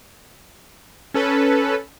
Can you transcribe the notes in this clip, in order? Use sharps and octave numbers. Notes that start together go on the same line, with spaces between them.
C#4 A4 B4